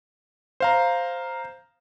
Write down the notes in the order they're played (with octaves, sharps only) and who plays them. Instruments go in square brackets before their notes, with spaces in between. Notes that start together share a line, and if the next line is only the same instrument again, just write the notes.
[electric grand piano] C5 F5 A#5